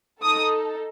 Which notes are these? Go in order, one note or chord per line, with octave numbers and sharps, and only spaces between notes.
D#4 A4 D#6